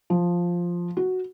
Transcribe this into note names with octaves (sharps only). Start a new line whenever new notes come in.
F3
F#4